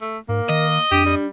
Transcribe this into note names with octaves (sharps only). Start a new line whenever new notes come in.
A3
G#2 A#3 A#4
D#3 D#5
F2 D4 G4
G3